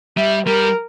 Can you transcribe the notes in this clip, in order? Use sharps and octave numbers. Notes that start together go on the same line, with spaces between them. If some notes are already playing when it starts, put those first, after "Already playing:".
G3 E5
G3 A#4